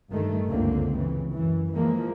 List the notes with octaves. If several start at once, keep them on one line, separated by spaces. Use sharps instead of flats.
G2 D#3 A3
F#1 C#2 D3 A#3 C4
C#3 E3
F#2 E3
E3 F3 G#3 A#3